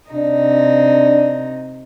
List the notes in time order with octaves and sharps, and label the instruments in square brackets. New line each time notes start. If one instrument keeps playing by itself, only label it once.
[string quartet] C3 D#4 [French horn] D4